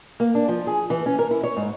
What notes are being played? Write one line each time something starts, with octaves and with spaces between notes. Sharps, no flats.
A#3
D4
F3
G#4
E3
C#4
A#4
E4
C#5
G#2